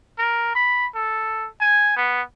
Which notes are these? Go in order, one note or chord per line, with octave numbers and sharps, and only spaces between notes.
A#4
B5
A4
G#5
B3